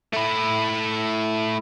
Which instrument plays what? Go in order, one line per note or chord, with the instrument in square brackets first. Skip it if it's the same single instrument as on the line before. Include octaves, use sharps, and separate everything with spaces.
[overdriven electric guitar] A3 E4